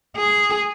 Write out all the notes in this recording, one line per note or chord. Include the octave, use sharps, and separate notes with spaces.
G#4